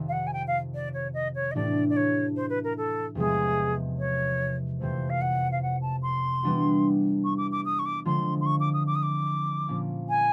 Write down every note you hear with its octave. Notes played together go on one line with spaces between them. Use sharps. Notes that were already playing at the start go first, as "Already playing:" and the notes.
Already playing: F2 C3 D#3
F5
F#5
G#5
G5
F5
D5
C#5
D#5
C#5
D#5
A2 E3 A3 D4 G4 D5
D5
C#5
C5
B4
A#4
A4
E2 C3 F3 G#3 G#4
C#5
F2 C3 E3 A3 C5
F5
F#5
F5
F#5
A5
C6
E3 G3 B3 D4 F#4
C#6
D6
D6
D#6
C#6
D6
D3 F3 G#3 C4 F4 C6
C6
C#6
D6
D#6
D6
D#6
D6
A#2 F3 A#3 C#4
G#5